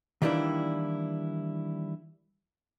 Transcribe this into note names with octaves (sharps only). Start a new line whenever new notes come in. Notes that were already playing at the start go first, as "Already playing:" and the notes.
D#3 E3 G3 A#3 D4 E4